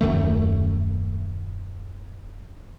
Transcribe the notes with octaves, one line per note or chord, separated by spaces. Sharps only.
D#1 F#2 D#3 A3